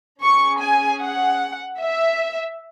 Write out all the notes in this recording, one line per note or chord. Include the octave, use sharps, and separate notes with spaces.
C#4 G#4 C#6
G#5
F#5
E5